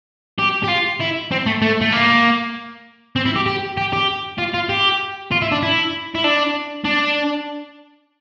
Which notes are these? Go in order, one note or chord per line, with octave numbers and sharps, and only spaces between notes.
G4
G4
F4
E4
C4
A3
A3
A3
A#3
C4
E4
G4
G4
G4
G4
F4
F4
G4
F4
E4
D4
E4
E4
D4
D4